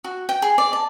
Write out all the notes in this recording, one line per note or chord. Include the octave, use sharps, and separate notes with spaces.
F#4
G5
G#4
D5
A5